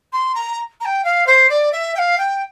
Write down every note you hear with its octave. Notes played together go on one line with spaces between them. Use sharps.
C6
A#5
A#5
G5
F5
C5
D5
E5
G5
F5
G5